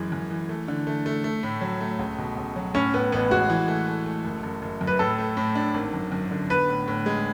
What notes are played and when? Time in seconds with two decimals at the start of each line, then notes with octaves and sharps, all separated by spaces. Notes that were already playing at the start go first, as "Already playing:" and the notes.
Already playing: F#2 E3 G#3
0.12 F#2
0.31 E3
0.49 A3
0.68 D3
0.87 A3
1.06 A3
1.24 A3
1.43 A2
1.61 F#3
1.81 A3
1.99 C#2
2.18 B2
2.37 C#2
2.56 F#3
2.74 A2 C#4
2.93 A2 B3
3.12 A1 B3
3.31 G#3 F#4
3.50 E3
3.68 A3
3.87 A3
4.06 A3
4.25 F#1
4.43 F#1
4.62 F#1
4.81 F#2
4.87 B4
4.99 A2 A4
5.18 A3
5.37 A2
5.55 D4
5.74 G#1
5.93 F#2
6.12 F#2
6.31 D3
6.50 B3 B4
6.68 A2
6.88 A2
7.06 G#3